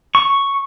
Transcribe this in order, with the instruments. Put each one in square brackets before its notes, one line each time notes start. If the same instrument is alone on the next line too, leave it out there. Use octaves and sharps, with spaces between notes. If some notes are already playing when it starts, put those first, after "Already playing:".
[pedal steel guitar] C#6